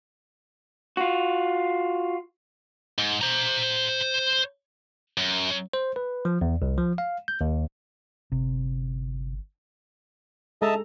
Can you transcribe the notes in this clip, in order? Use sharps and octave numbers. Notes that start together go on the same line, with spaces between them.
F4 F#4
G#2
C5 A#5
F#2
C5
B4
F3
E2
C2
F3
F5
G6
D#2
G1 C3
G#3 A4 D#5 E5 A5 A#5